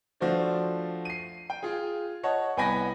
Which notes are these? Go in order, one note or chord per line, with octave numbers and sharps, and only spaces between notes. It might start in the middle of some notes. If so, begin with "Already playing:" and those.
F3 A3 D4 F#4 C5 D5
C7 D#7
G5
F4 G#4
C#5 D#5 F#5 A5
C2 B3 G5 G#5 B5 A#6